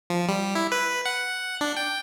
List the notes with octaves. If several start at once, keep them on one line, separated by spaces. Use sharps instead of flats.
F3
G3
E4
B4
F#5
D4
G5